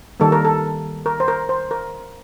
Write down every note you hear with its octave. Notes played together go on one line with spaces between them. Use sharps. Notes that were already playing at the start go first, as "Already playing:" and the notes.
D#3 G3 A#3 A4
A#4
A4
A#4
C5
A#4
C5
A#4